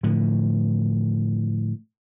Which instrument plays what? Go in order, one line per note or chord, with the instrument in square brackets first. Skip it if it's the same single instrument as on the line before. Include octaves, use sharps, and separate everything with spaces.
[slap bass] A2 D3 F3